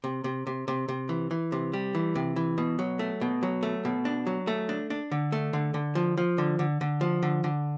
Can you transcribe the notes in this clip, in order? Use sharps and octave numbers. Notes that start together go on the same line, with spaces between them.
C3
C3
C3
C3
C3
E3
E3
C3
G3
E3
C3
E3
B2
F#3
A3
B2
F#3
A3
B2
D4
F#3
A3
D4
D4
D3
A3
D3
D3
F3
F3
D3
D3
D3
F3
D3
D3